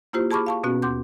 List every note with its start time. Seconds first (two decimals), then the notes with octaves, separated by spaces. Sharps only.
0.13 A#3 E4 F4 G4 C5
0.31 G#4 A5 B5 C#6 D6 F6
0.46 F5 A5 C#6
0.64 B2 B3 C#4 F#4
0.82 D#2 C6 D6 G6